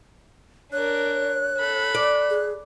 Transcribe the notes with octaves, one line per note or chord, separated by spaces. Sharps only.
D4 A#4 C#5 F#6
A4 B5
D5
G#4